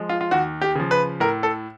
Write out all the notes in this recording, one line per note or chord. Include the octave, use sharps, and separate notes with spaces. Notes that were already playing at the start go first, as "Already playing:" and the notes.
Already playing: F3 G#3
F4
F4
D#2 F#4
G4
C#3 F3
B4
A2 A#4
A4